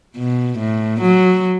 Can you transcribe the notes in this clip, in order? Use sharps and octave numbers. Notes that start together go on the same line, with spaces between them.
B2
A2
F#3